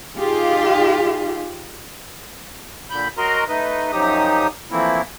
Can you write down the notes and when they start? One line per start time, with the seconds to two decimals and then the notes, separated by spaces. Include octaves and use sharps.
0.17 D#4 F4 G4 G#4 F5
2.90 A#2 D3 B5 G6
3.18 F#3 F#4 A#4 D#5 A#5 C6
3.48 A3 D#4 B4 D#5
3.92 F#2 F3 F#3 D#4 G4 D#6
4.71 E3 F3 A3 A#3 C4 E4